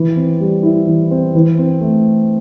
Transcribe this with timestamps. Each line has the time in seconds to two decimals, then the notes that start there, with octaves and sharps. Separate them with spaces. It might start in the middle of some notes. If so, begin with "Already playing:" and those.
Already playing: E3
0.16 C4
0.40 G3
0.63 E4
0.87 E3
1.11 C4
1.35 E3
1.58 C4
1.81 A3